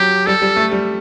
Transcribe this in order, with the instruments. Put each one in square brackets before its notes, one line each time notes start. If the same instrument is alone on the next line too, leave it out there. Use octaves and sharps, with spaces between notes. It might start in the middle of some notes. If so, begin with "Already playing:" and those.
Already playing: [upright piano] F#3 [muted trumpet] G4
[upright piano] G3 [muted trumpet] A4
[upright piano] G3
A3
G3